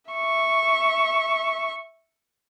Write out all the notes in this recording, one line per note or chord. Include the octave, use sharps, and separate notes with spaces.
E5 C#6